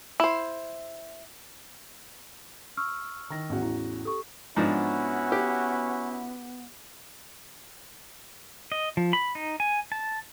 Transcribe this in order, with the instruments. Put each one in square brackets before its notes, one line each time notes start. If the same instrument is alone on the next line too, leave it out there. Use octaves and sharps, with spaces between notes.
[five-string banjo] E4 C5
[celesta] C#6 E6 F6
[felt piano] D#3 A#6
A1 E2 F#4
[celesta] E4
[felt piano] G4 [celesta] A4 C#6
[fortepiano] G#2 F3 D4 [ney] B3 [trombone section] C#4 E4 F#4
[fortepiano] G4
[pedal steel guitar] D#5
F3
B5
D#4
G#5
A5